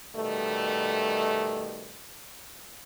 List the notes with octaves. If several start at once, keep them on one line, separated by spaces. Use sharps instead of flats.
B2 D#3 G3 A3